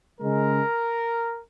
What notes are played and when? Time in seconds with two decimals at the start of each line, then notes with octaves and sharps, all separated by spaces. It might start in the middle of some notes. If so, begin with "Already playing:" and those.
0.21 C#3 G#3 A#4